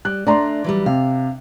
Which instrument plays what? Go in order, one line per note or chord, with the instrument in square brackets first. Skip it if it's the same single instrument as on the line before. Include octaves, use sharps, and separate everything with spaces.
[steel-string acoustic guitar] G3 [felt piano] F#6
[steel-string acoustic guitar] A3 D4 [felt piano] D5 A#5 C6
[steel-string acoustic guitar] E3 F#3 G3
[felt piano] C3 [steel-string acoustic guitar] F5